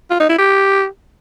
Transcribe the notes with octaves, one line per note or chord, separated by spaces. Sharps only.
F4
D#4
E4
G4